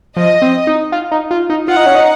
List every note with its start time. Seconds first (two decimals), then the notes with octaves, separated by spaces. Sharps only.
0.16 F3 D#5
0.42 C4
0.67 D#4
0.92 F4
1.11 D#4
1.31 F4
1.50 D#4
1.68 F4 F#5
1.77 D#4
1.86 C#4
1.95 D#4